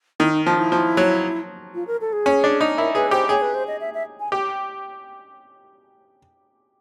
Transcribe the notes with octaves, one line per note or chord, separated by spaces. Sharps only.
D#3 E4
D#4
F3 D#4
E4
F3
F#3
F4
A#4
A4
G#4
C#4
D4
D#4
E4 A#4
G#4 B4
G4 C5
G#4 C#5
B4
C5
D#5
E5
E5
G#5
G4